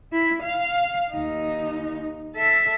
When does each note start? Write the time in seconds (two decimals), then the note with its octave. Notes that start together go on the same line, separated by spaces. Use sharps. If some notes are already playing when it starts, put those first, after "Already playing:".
0.12 E4
0.43 F5
1.12 D#2 D#4
2.35 A4 E5